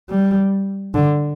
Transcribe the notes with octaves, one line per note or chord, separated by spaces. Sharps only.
G3
D3